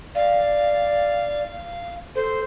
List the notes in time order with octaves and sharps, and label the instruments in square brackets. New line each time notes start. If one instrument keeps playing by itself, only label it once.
[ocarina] D5 [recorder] F5
[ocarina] A4 [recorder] C5